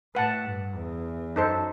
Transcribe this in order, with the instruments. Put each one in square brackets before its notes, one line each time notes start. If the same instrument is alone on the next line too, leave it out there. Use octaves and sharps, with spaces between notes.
[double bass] A2 [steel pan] B4 F#5 A5
[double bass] G2
E2
[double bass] F#2 [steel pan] D#4 A4 C5